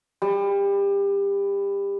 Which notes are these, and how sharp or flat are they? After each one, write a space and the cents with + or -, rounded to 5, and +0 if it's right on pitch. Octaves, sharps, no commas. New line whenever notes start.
G3 +25